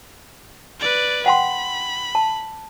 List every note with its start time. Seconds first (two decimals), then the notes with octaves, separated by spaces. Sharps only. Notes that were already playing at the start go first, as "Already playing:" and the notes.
0.80 B4 D5
1.26 F#5 G5 B5 C6
2.15 A5